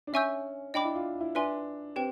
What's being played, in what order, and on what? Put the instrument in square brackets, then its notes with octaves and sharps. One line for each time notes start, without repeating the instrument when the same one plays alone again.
[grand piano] D4
[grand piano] C#4 [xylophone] E5 G#5 C#6 E6 G6
[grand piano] D4 [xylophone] D#5 G5 B5 D6
[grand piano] E4
F4
E4
[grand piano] D4 [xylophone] B4 E5 G#5 C6
[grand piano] C4 [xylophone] G4 B4 G5